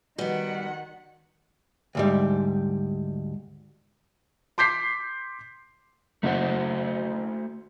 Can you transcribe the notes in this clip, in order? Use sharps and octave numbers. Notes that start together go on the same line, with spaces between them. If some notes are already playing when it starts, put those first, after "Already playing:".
D#3 G3 B3 F#4 B4 D#5 F#5
D2 G#2 G3
C6 D6 G6 B6 C7
F#1 A3 F#4 C5 F#5